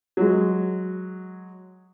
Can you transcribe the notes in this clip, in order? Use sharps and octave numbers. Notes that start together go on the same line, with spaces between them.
F#3 G#3